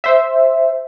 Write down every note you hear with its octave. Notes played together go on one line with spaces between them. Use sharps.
C5 E5